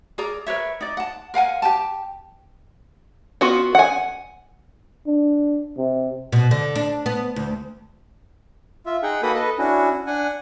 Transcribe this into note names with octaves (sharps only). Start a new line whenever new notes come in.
G#4 A#4 D5 A#5
A#4 B4 C#5 E5
D#4 D5
F#5 A5
A#4 F5 F#5 G#5
G4 G5 A5
B3 F4 F#4
F#5 G#5
D4
C3
B2
D3
D4
B3
D2
F4 E5
D#4 G#4 F#5 G5
A#3 F#4 A4 B4 B5 D#6
A4 B4 D#5
C#4 D4 E4 F#4
D4 F#5 G#5